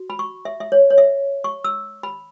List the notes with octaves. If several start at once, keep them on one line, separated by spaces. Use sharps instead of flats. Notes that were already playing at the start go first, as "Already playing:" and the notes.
Already playing: F#4
B5
C#6
E5
E5
C#5
C#5
E5
C#6
E6
B5